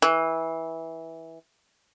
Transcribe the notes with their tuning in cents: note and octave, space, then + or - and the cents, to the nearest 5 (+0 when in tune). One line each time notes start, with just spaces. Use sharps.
E3 -15